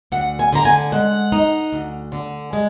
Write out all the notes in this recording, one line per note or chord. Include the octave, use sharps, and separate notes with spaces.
D2 F#5
G#5
D3 A#5
G#5
G#3 F#5
D#4
D2
D3
G#3